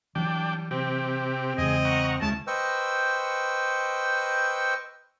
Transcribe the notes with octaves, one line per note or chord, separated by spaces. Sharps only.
E3 F#3 G3 D4 G5
C3 C4 G4
E2 C#3 G#3 G#4 D#5
F#5 A#5 C#6
D2 C#3 G#3 E4 A5
B4 C5 D#5 G5 C#6 E6